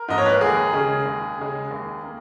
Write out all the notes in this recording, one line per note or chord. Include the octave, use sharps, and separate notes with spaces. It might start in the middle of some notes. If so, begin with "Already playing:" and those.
Already playing: A#4
G#2 F3 A#3 D#5
C#5
B4
A#4
D#2 G#4
C#3 G#3
D#2
C#3 G#3
D#2
A#3